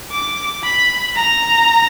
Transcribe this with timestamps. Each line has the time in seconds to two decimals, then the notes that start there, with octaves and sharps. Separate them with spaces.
0.11 D6
0.64 B5
1.16 A#5